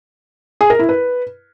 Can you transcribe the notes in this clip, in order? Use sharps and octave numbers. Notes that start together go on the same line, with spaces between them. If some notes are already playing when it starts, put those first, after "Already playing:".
G#4
A#4
E4
B4